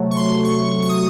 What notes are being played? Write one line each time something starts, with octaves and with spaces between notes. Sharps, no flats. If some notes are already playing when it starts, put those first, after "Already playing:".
Already playing: C3 F#3 A3
C#6
C6
C#6
C#6
D#6